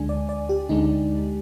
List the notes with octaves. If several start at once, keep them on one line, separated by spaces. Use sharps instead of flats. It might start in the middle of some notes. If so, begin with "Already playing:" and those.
Already playing: D2 D3 G#3 D4 G#5
D5
D5
G4
D2 D3 G#3 D4 D#4